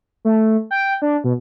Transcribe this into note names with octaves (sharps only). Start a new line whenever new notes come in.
A3
G5
D4
B2